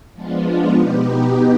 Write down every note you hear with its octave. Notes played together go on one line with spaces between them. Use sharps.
F3 G#3 B3 D4 F4
B2 B3 D#4 G4